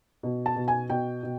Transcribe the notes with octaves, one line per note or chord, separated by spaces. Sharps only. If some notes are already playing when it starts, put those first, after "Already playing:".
B2
A5
B2
G#5
B2 G5
B2